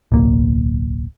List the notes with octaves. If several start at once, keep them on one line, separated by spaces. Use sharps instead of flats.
D1 B1 A#3